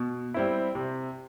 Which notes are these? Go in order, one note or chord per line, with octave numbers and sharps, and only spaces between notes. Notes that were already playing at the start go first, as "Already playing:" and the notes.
Already playing: B2
G3 C4 E4
C3